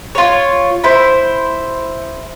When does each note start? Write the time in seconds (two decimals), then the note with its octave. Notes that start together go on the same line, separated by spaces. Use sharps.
0.15 F4 C#5
0.84 E4 C5